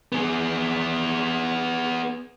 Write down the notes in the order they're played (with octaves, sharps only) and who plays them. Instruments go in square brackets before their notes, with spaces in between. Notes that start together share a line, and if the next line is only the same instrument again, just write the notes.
[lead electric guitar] B3 G#4